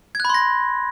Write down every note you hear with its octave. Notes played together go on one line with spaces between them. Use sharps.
B5 C6 F#6 G#6 A#6